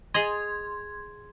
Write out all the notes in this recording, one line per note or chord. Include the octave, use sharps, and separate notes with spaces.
G#4 D#5 C6 G#6